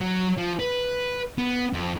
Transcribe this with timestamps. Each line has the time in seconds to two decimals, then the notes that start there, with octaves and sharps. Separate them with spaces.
0.01 F#3
0.37 F3
0.59 B4
1.38 B3
1.73 F2